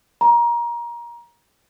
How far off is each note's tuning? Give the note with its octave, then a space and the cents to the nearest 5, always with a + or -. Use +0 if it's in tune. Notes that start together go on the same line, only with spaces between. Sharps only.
A#5 +25